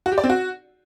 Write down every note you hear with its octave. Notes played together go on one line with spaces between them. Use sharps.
F#4
G4
D5
C4
F#4